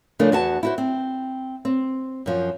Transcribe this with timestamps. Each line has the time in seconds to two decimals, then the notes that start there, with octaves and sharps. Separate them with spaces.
0.19 C#3 F3 A3 D4 A#4
0.32 E2 F#4 F#5 A5
0.63 E4 F#4 C5
0.78 C4
1.65 C4
2.26 F#2 F3